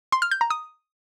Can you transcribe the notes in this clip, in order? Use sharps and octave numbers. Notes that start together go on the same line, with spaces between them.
C6
F6
G6
A#5
D#6